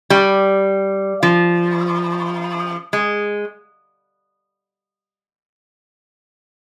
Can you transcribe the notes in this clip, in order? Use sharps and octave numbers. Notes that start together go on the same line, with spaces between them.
G3
F3
G#3